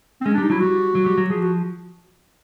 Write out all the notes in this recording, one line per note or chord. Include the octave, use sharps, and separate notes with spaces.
C4
G#3 C#4
D4
G3 D#4
F#3 E4
G3 F#4
F#3
G3
F#3
F3 G#4
F#4